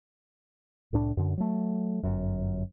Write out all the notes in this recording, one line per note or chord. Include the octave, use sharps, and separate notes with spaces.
C2 A2 D4
F#2 D3
F#3 A3
G1 F#2